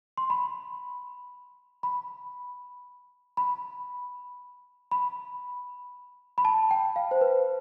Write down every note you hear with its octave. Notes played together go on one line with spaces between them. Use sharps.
C6
B5
B5
B5
B5
B5
A5
G5
F5
C5
B4